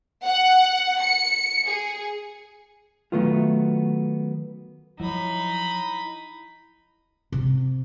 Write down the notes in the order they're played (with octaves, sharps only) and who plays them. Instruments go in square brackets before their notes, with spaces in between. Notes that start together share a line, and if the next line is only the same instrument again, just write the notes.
[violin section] F#5
C#7
G#4
[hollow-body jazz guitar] D#3 F#3 A3 B3 F4
[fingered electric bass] F3 F#3 [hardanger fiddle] D#4 B5 [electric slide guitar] E4 C#5
[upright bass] C3